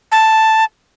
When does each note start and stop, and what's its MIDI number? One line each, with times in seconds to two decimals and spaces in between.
0.12 0.64 81